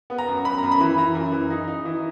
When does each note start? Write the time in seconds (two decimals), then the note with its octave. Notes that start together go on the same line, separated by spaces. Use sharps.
0.10 B3
0.18 A#5
0.28 F#2
0.45 F#2 B5
0.58 F#2 A#5
0.72 B5
0.80 E3
0.98 E3 A#5
1.15 F#2
1.32 E3
1.50 D#4
1.68 D#4
1.85 E3